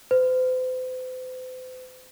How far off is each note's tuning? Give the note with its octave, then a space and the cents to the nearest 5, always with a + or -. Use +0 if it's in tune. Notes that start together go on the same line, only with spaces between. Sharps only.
C5 -40